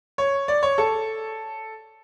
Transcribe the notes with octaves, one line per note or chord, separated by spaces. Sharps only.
C#5
D5
C#5
A4